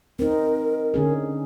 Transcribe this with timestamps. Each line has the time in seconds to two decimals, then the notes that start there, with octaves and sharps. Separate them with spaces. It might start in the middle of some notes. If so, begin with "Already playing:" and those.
0.19 C4 D#4 A#4
0.94 D3 C#4 G#4